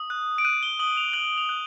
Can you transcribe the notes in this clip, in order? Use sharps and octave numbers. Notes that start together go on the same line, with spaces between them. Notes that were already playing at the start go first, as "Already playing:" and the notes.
Already playing: D#6
F#6
D7
F#6 D#7
G7
D#6 F#7
F7
F#6 F#7
F7
F#6